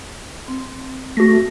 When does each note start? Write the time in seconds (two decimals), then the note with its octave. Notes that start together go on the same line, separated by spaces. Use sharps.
0.48 C4
1.17 A3 F#4 A#6